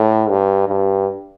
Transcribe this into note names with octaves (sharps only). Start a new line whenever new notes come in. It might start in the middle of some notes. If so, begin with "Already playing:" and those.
Already playing: A2
G2
G2